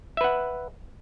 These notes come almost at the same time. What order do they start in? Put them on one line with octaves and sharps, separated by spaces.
E5 B4 F#5